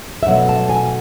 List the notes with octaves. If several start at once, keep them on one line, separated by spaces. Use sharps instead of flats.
E5
B2 F#3 A3 F#5
A5
G#5